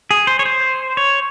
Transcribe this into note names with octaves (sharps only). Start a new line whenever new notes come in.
G#4
C5
C#5
C5
C#5